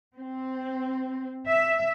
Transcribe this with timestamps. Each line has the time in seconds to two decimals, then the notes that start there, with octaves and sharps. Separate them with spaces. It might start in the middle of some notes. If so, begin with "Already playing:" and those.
0.17 C4
1.47 E5